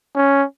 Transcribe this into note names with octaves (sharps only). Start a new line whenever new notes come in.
C#4